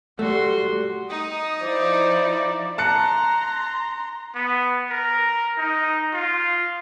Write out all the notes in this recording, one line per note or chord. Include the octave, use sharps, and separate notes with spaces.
G3 A3 F#4 C6
D#4 D#6
F3 E4 C5 D5
A5 A#5 C6 F#6 C#7
B3
A#4
D#4
F4